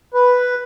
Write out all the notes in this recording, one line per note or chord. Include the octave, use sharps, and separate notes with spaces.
B4